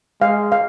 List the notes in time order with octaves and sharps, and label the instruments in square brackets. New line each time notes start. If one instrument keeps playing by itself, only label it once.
[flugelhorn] G#3 [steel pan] F5
[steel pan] F5